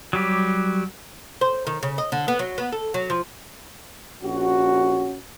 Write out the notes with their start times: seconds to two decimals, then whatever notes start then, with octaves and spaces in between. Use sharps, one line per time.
0.13 F#3 G3 G4
1.41 C5
1.67 D#3
1.83 C#3
1.98 D#5
2.12 D3
2.28 B3
2.39 F#3
2.58 B3
2.72 A4
2.94 F#3
3.10 F3
4.23 A#1 C#4 F#4